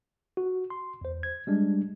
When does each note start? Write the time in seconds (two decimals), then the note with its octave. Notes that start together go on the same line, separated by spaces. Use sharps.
0.37 F#4
0.70 C6
1.01 E2 C5
1.23 G#6
1.47 G3 G#3 D4